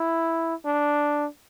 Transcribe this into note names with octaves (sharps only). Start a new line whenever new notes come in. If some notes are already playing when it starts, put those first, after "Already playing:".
Already playing: E4
D4